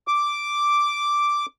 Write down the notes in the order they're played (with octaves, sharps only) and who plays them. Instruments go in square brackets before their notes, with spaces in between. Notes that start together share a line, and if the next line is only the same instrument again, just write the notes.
[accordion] D6